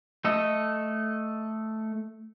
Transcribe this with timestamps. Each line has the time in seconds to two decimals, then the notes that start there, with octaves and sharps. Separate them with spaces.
0.25 A3 A4 D#5